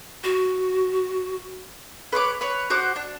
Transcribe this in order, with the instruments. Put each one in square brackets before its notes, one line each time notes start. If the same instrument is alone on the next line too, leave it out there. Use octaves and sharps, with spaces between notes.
[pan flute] F#4
[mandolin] B4 C#5 C6 D6
B4 C#5
F#4 C5 F#5 D6
D4